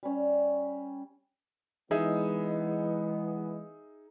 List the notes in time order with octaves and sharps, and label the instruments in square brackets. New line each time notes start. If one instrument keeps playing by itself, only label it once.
[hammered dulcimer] G3 C#4
[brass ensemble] E3 G#3 B3 [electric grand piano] D#4 G#4 E5